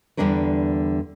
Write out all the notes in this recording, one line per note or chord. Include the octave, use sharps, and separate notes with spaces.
E2 D3 G3 D4 A#4 B4